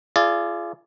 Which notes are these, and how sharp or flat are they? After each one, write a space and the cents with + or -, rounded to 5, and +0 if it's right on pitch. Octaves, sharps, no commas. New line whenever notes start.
F4 -30 G#4 +20 D5 +5